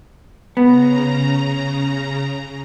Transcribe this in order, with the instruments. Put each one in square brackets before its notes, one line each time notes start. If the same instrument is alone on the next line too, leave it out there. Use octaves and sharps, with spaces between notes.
[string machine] C#3 A#5 [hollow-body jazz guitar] B3